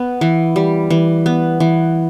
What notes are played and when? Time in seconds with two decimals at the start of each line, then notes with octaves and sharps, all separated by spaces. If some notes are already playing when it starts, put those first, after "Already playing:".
Already playing: B3
0.21 E3
0.56 G3
0.90 E3
1.26 B3
1.60 E3